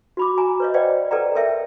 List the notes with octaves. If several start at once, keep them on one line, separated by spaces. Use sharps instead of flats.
F#4 B5 D6
G#5 A#5
B4 C#5 D#5
B4 C5 D5 D#5 F#5 G5
A4 B4 D5 F#5 G5 A#5
A4 A#4 C#5 E5 G5